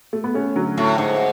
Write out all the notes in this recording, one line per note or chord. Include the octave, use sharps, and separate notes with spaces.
A3
B3
A3 C#4
D3 F#3
A2
G#2